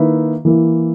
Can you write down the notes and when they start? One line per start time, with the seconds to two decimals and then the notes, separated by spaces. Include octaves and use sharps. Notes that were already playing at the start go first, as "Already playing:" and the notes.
Already playing: D#3 A#3 E4 B4 E5
0.45 E3 A#3 E4